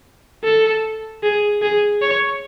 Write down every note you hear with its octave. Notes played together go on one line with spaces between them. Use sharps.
A4
G#4
G#4
C#5